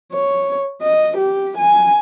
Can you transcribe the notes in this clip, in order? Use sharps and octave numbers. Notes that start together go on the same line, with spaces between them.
C#5
D#5
G4
G#5